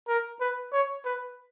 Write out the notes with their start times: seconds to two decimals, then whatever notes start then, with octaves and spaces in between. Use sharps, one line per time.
0.08 A#4
0.41 B4
0.73 C#5
1.05 B4